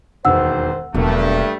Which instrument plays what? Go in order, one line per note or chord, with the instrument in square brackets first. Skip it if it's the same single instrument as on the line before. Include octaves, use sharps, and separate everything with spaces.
[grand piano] E1 D#2 B2 [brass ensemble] C5 [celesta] F#5 E6
[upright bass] E1 [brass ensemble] G2 A3 [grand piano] F#3 A#3